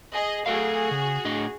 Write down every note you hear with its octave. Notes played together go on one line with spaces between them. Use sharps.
G#4 D#5
A3 F#4 G#4 A4 F5
C#3
A2 D4 D#5